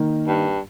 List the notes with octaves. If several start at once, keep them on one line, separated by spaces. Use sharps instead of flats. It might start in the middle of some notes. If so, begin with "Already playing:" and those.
Already playing: D#3 A#3 D#4
G2